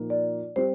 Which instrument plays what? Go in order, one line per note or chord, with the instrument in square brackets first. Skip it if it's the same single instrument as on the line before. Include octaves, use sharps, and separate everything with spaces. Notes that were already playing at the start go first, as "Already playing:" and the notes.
Already playing: [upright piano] A#2 F3 A#3 D#4
[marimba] D5
[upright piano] G3 C4 G4 [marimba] C5